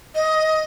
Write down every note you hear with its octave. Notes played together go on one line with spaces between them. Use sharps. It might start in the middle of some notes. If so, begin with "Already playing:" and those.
D#5